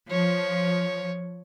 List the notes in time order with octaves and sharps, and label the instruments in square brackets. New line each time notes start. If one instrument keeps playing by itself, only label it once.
[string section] F3 [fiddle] C#5